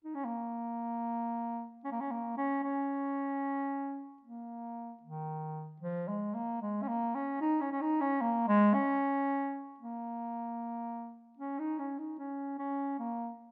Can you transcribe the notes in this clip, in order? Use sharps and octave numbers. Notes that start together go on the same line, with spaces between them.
D#4
C#4
A#3
C#4
A#3
C#4
A#3
C#4
C#4
A#3
D#3
F3
G#3
A#3
G#3
C#4
A#3
C#4
D#4
C#4
C#4
D#4
C#4
A#3
G#3
C#4
A#3
C#4
D#4
C#4
D#4
C#4
C#4
A#3